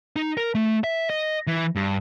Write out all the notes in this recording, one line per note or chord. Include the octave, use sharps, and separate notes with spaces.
D#4
A#4
A3
E5
D#5
E3
G2